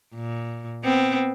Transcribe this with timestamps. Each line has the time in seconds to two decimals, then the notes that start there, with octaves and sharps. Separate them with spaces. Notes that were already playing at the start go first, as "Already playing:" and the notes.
0.15 A#2
0.84 B3 C4